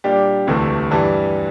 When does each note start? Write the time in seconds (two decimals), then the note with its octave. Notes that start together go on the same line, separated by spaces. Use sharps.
0.04 A#2 G3 D4 G4
0.47 E1 D2 C3 E3 A3
0.91 G2 E3 G3